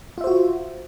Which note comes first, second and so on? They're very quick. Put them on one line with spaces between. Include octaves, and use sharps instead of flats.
F4 E5 C5 F#4